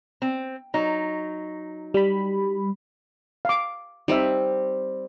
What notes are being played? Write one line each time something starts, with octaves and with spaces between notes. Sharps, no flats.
C4
F#3 D#4
G3 B5
F5 D6
G3 C4 D#4 E5